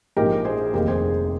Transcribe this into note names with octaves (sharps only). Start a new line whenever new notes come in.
A#1 G#2 F3 A#3 D#4 G4 A#4
G#4 C5
F1 D#2 D#3 A#3 G4 A#4
G#4 C5